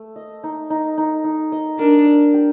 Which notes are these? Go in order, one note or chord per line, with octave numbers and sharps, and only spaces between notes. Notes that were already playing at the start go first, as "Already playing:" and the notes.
Already playing: A3
D#5
D#4
D#4
D#4
D#4
D#5
D4 A#4
D5
G4